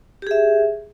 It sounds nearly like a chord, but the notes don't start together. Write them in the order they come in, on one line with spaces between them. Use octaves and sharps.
G4 G#4 E5